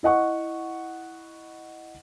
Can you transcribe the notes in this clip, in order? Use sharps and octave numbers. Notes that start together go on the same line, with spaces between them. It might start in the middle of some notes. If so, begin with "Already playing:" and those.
E4 D#5 F#5 C#6